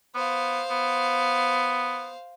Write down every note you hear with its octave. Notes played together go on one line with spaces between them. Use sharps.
B3 C5 F5
B3